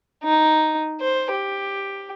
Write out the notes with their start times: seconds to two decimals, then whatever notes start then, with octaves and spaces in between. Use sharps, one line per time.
0.23 D#4
1.00 C5
1.32 G4